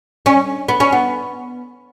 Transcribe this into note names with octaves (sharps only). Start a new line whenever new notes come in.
C#4
B3
C#4
B3